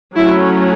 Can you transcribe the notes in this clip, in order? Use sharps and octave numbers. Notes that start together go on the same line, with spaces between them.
F#3 A3 C#4 E4